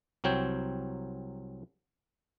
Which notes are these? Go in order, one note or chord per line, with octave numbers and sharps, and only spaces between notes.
C2 F#3 C4 C#5 G5